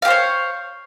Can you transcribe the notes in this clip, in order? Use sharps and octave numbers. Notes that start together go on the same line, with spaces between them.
G4 C5 C#5 F5